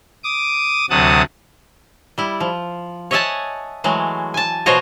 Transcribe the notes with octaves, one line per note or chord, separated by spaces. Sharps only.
D6 D#6
D2 C3 F#3 F#5 A5 D#6
G3 E4
F3
C#5 D#5 E5 F#5 G#5 A5
E3 F#3 G#3 A3
G#5 A5
B2 F3 F#4 C5 C#5 D#5